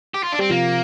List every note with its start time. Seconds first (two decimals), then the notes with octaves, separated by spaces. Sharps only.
0.14 G4
0.23 F4
0.32 D4
0.39 G3 C4
0.50 C3 F3 A#3